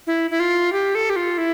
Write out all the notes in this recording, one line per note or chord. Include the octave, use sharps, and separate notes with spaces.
E4
E4
F4
G4
A4
G4
F4
E4